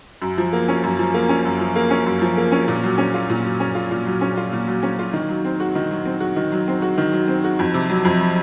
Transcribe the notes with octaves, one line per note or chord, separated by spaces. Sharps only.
F#2
F3
A#3
C#4
F#2
F3
A#3
C#4
F#2
F3
A#3
C#4
F#2
F3
A#3
C#4
A#2
F#3
C#4
F4
A#2
F#3
C#4
F4
A#2
F#3
C#4
F4
A#2
F#3
C#4
F4
D#3
F#3
C4
F#4
D#3
F#3
C4
F#4
D#3
F#3
C4
F#4
D#3
F#3
C4
F#4
F2
C3
F#3
F2